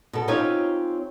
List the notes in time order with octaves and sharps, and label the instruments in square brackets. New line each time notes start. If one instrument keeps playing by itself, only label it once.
[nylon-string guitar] B2 A4
C4 C#4 D#4 F4 G4 C#5